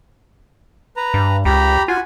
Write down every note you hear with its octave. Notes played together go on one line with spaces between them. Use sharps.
B4 A#5
G2
C#2 G4 A#5 B5
F4 F#4 G#5